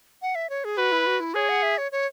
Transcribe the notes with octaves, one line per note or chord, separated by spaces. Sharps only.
F#5
E5
C#5
G#4
F#4 B4
E4
F#4
E4
G#4 C#5
F#5
E5
C#5
C#5